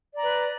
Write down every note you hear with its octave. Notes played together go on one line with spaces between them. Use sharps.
B4 D5 A#5